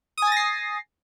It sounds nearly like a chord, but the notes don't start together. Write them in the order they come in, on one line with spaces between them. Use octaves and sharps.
D#6 G#5 A6 A#6 C7